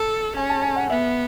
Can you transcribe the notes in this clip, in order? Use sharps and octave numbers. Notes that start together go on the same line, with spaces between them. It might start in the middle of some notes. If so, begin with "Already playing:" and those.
Already playing: A4 A5
C#4 G#5
A5
G#5
F#5
B3 E5